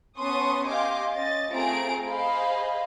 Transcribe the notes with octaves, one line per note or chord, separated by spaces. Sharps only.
B3 C#4 A5 C6 C#6 D#6
G4 D#5 F5 G#5 C6 D6
C#4 D#5 A6
A3 C4 F4 G#4 A#5 D7
G#4 C5 D#5 F5 B5